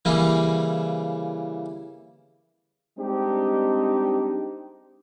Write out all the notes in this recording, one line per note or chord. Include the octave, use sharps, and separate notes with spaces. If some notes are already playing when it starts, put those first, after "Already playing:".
C#3 E3 G3 A#3
G3 G#3 C4 D4 D#4 G4